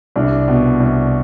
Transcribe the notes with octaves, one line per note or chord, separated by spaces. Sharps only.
C2 D4
B2
C2